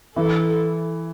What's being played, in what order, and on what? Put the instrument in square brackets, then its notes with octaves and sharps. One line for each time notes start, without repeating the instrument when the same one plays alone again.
[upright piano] E3 [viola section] E4 A4